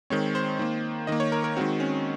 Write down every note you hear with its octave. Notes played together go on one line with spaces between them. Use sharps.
D#3 G#3 C4 C#5
C5
D#3 A#3
D#3 A#3 D#5
C#5
A#4
A#4
D#3 G#3 C4 F#4
C#4